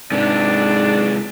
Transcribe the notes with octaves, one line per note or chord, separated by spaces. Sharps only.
G#2 C3 G#3 D4